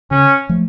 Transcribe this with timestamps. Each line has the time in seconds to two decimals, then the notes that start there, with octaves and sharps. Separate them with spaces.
0.11 C#3 C#4
0.49 F3 A3